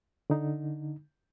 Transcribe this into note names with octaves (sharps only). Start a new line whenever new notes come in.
D3 D#4